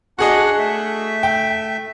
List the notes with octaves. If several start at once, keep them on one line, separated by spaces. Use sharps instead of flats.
D4 F#4 G#4 D#5 F#5 F#6
A3 E5
G5